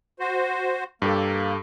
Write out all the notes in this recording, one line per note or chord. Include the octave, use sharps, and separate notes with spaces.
F#4 C5
G2 A#3 G4 A4